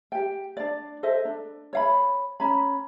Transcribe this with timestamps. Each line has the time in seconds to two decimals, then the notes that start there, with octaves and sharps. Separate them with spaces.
0.12 G4 G5
0.57 D4 D5
1.03 A4 C5 D#5 E5
1.25 D4
1.73 C#5 F5 B5
2.40 C#4 A#5 B5